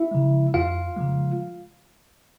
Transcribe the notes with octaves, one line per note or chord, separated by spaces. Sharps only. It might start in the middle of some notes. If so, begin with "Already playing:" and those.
Already playing: E4 E5
C#3 F3 G#3
F2 F4 F5
C#3 F3 G#3